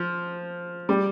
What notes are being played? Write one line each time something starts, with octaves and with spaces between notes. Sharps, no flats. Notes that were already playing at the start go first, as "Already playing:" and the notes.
Already playing: F3
G3